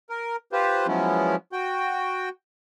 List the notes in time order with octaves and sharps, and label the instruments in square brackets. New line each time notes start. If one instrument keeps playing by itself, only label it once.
[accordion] A#4
F4 G4 B4 C5
F3 F#3 G#3 B3 C#4 E4
F#4 G5